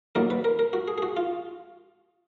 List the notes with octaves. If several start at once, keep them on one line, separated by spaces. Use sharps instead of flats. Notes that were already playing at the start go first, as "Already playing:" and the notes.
D#2 D3 F#3 A#4
B4
A#4
A#4
F#4
G#4
G#4
F#4
F4